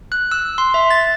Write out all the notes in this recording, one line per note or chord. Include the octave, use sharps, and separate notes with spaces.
F#6
E6
C6
E5
A6